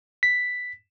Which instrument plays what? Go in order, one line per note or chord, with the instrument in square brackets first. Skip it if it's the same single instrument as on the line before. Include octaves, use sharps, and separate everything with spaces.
[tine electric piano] B6